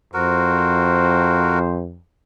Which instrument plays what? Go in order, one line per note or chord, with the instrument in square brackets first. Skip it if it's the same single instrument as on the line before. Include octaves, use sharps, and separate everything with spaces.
[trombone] F2 [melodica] F#4 A#4 [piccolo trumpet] C5